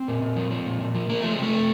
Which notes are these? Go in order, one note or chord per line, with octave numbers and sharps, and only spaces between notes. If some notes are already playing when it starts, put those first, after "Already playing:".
Already playing: C4
A#2
A#2
F3
F3
A#2
A#2
F3
F3 A#3
F3 A3
G#3
C3 A3
C3